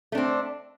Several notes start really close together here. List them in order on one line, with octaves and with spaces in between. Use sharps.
A3 D4 C4